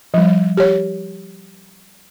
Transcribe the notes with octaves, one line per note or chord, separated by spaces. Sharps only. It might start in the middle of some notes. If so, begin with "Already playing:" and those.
F3 G3
G4 C#5